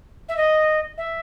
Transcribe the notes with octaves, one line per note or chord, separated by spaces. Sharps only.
E5
D#5
E5